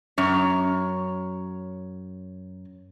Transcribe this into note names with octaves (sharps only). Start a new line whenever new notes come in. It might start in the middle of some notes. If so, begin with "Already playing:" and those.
F#2 C#5